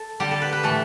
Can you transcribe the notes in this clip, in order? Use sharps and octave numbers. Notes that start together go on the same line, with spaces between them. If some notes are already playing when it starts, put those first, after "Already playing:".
Already playing: A4
D3 G3 G4
A4
B4
B4
A2 E3 A3 A4